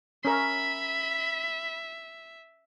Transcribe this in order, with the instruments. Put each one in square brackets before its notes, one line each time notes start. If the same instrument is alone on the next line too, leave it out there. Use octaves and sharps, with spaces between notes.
[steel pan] C#4 A#4 [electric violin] E5 [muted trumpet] B5